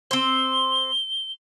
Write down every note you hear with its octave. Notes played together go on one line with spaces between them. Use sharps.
C4 C5 G7